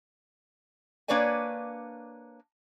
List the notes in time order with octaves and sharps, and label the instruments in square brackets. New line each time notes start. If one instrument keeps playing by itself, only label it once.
[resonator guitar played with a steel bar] A#3 D4 B4 C#5 D5 G#5